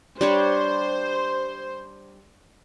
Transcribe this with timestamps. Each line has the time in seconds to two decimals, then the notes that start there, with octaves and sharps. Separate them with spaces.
0.21 G3 D4 C5 C#5